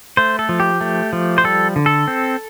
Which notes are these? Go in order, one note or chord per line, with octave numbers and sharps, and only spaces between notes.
A3 C5
A4
F3
G4
A3
F3
C5
G3 A4
D3
A4
C4